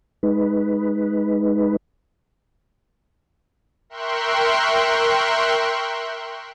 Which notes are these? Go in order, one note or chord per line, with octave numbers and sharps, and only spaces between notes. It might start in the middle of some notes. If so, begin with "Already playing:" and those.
G#3 D#4 B4
A#4 E5 G5 C6 C#6 F#6